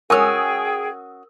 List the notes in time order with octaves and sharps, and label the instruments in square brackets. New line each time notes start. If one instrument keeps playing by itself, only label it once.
[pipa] C#4 F#4 [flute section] G#4 G5 [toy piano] A#4 [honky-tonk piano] G#5 D#6 E6